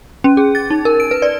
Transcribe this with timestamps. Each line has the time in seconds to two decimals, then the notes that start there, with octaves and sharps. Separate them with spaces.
0.24 C#4
0.37 G#4
0.55 A6
0.70 D#4
0.85 A#4
1.00 D7
1.11 B4
1.22 D5